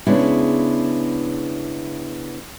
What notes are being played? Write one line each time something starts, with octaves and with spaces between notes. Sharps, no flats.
C#3 G#3 B3 D4 E4